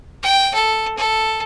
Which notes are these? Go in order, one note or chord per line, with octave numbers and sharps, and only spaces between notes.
G5
A4
A4